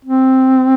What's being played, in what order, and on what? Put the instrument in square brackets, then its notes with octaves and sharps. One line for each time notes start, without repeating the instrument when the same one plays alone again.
[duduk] C4